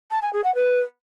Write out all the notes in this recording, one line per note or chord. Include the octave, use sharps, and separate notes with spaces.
A5
G#5
G#4
F#5
B4